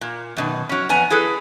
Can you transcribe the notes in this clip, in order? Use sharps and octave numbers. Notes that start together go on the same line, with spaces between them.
A#2
F#2 B2 D#3
F#3 C#4
F2 B3 G#5 A#5
E4 G#4 A4 B4